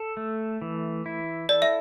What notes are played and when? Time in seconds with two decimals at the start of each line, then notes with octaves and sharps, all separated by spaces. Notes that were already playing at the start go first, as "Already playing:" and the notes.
Already playing: A4
0.17 A3
0.62 E3
1.06 E4
1.49 A4 D5
1.62 E5